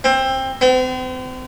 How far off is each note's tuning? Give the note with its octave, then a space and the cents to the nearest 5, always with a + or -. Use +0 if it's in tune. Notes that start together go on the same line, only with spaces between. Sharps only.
C4 +20
C4 -40